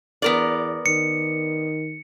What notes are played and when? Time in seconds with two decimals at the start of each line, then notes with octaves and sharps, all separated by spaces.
0.22 E2 B3 A#4 D5
0.86 D#3 C#7